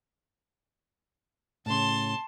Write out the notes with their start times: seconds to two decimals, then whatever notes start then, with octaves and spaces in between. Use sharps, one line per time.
1.66 A2 C#3 A5 C6